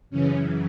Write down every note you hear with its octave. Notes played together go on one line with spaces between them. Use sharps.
F#2 C#3 E3 C#4